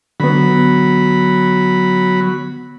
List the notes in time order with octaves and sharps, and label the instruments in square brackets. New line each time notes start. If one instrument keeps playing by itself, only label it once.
[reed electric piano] D3 B3 [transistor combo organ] F#3 B5